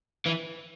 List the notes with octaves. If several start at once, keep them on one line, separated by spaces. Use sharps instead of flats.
E3